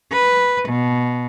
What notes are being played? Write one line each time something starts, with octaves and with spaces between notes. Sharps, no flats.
B4
B2